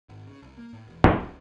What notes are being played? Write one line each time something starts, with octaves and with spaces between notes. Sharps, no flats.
G#1
C#3
C2
A#3
A2
E1
F2
C#2